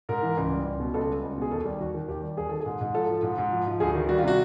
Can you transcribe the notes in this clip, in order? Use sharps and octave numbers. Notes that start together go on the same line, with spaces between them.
G#2 A#4
E3
C#2
G3
C#2
B2
C#2 A4
G3
C#2
B2 G#4
D#2 A4
G3
D#2 F#4
D#3
D#2 G4
G3
D#2 G#4
D#3 A4
G#4
G#2
G#2
F3 A4
F3
G#2
G#2
F3
F3
D2 G#4
D#3
G3 F#4
F4
C3 F#4